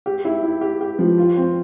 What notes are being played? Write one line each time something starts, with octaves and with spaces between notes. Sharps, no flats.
G4
E4
E4
G4
G4
F3
F4
C4